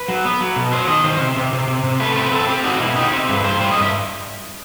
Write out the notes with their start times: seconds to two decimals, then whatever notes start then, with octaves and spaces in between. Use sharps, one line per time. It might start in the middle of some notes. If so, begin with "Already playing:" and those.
Already playing: B4
0.08 F#3
0.25 B3
0.41 F#3
0.56 B2
0.72 F#3 C5
0.88 D#3 D#5
1.04 D#3 C5
1.20 C3
1.36 C3
1.53 C3
1.68 C3
1.84 C3
2.00 A3 B4
2.16 C4 B4
2.32 C4 A4
2.49 C4 G4
2.64 D#4 F#4
2.80 B2 E4
2.96 D#4 G4
3.13 C4
3.28 G2 B4
3.44 G2 C5
3.60 G3 C5
3.71 D#5
3.77 G2
3.82 E5